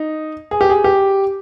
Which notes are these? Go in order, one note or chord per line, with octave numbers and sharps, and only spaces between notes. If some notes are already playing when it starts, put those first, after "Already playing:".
Already playing: D#4
G#4
G4
G#4
G4